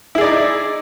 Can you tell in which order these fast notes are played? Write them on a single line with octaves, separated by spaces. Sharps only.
E4 G#4 D5 D#4